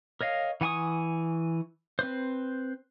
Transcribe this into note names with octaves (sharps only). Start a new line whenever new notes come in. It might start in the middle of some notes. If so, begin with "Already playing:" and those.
A#4 C#5 D#5 F5
E3 F#5 G#5 C#6 D#6
C4 B4 C5